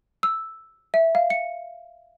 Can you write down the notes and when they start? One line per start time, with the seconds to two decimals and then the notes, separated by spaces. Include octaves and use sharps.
0.23 E6
0.94 E5
1.15 F5
1.30 C#7